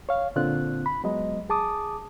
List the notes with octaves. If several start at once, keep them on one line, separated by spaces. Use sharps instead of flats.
C#5 F5
A#2 D3 C4 F4 F#6
B5
F#3 G#3 B3 D#5
G#4 A5 D6 D#6